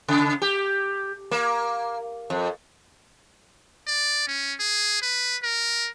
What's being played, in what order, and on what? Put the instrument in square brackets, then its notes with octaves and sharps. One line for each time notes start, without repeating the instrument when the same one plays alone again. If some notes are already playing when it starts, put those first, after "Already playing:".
[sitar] C#3
G4
A#3
F2
[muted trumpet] D5
C#4
G#4
B4
A#4